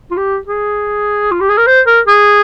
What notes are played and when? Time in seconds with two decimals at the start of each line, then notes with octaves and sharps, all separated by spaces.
0.11 F4
0.17 G4
0.47 G#4
1.31 F4
1.41 G4
1.50 G#4
1.58 A#4
1.67 C5
1.86 A#4
2.07 G#4